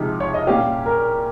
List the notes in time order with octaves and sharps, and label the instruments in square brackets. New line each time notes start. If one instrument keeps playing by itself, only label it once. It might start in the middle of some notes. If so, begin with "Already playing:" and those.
Already playing: [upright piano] C3 F3 G#3 D#4 G4 [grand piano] D#5
[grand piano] C#5
D#5
[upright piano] A#2 G3 C#4 G4 [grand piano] F5
[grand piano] A#4